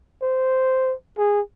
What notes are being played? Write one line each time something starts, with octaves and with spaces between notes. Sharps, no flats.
C5
G#4